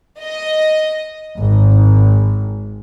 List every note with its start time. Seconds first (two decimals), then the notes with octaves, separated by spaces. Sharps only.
0.21 D#5
1.36 G#1